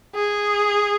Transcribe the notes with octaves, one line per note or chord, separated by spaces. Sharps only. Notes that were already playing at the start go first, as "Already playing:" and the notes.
G#4